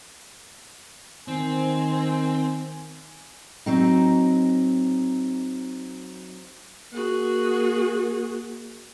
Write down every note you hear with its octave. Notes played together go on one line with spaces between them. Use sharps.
D#3 C4 G#5
F#3 C4 D#4
A#3 F#4 G#4